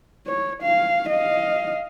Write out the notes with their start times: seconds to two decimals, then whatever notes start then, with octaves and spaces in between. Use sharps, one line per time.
0.27 C#5
0.62 F5
1.09 D#5 F5